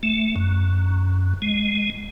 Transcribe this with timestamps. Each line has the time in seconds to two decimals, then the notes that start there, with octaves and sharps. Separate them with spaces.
0.03 A3
0.36 F#2
1.42 G#3